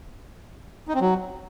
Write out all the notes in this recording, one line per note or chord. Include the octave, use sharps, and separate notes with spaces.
D#4
C4
F#3